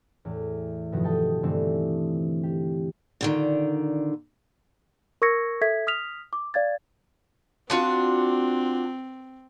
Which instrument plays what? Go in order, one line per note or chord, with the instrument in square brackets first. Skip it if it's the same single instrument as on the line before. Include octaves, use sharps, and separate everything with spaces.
[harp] E2 A2
G2 B2 D#3 F3 F#4
A4 D#5 G5 A5
G2 D3 E3 A3 C4
G4
[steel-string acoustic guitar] A#2 D3 D#3
[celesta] A#4 C#6 E6 G#6 A#6 C#7
A4 E5 G#6 B6
D#6 F6 B6 F7
D6
D5 F5 G#6 A6
[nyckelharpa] C4 [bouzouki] D4 F4 F#4